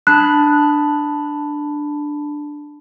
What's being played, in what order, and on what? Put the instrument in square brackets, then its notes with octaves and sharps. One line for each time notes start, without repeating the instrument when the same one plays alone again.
[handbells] D4 A5 B5 [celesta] F#6